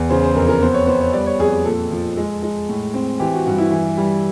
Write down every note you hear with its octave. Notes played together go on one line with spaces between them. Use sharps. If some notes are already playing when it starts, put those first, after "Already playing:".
Already playing: E2
C#3 C5
C5
F2 A#4
A#4
B3 C5
C#5
B3 C5
C#5
G3 D5
C#5
F2 G#4
A#2 A4
F3
G#3
G#3
A2
C4
E3 G4
F#4
G2 F#4
E4
E3
G3